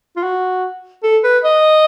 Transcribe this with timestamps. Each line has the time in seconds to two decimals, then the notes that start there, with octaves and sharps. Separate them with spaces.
0.16 F4
0.23 F#4
1.03 A4
1.24 B4
1.44 D#5